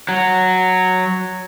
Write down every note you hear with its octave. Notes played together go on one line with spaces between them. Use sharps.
F#3